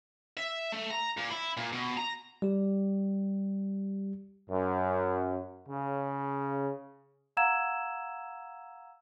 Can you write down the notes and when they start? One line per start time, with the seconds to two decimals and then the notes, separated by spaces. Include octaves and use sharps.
0.37 E5
0.72 A3
0.91 A#5
1.17 A#2
1.30 E4
1.57 A#2
1.73 B2
1.98 A#5
2.42 G3 G4
4.50 F#2
5.68 C#3
7.37 F5 F#5 A#5 E6 G#6 E7